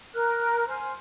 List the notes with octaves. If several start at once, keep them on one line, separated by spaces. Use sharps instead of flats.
A#4 F6 F#6
C5 G#5 F6